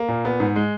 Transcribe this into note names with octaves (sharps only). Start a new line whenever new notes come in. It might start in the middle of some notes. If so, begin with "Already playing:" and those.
Already playing: A#3
A#2
B3
G#2
G#3